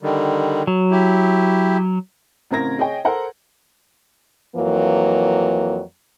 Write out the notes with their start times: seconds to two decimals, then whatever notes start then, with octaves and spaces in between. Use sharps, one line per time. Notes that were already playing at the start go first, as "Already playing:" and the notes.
0.03 D3 D#3 G3
0.67 F#3
0.91 E4 G4
2.51 A1 C#3 C4 A#4 G#6 A#6
2.79 G#4 C#5 D#5 G5
3.05 A4 A#4 C5 F#5
4.56 F2 E3 F#3 A#3